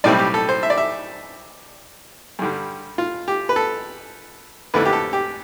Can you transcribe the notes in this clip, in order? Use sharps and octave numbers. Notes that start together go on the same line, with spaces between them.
B1 A2 G3 C4 E4 D5
G4
A4
C5
E5
D5
E5
G2 D3 G3
F4
G4
B4
A4
F2 D3 A3 E4 B4
G4
A4
G4